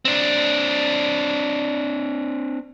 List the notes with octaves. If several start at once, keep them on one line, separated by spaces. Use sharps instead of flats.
C4 D4